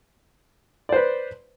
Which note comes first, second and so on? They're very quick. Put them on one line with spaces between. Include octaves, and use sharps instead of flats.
D5 C5 B4